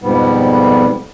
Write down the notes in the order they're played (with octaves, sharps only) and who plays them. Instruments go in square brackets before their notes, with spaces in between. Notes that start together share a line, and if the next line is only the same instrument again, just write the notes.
[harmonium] F2 G#2 B2 G3 B3